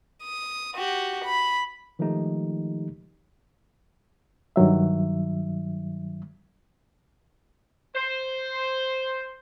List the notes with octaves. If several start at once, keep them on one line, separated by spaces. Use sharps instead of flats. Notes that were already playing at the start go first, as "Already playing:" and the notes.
D#6
F#4 G4
B5
D#3 F3 G#3 A3 D#4 G4
G2 D#3 F#3 E5
C5